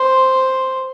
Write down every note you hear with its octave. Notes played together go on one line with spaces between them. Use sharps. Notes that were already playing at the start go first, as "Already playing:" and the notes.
Already playing: C5